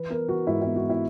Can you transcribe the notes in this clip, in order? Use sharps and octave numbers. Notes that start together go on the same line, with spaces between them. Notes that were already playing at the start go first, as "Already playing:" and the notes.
Already playing: E3 B4
B3 A#4
E3 F#4
G#2 E4
B3 E4
F#4
B3 E4